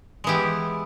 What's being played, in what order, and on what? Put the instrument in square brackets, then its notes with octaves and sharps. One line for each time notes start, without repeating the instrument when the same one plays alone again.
[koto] E3 G#3 B3 E4 G4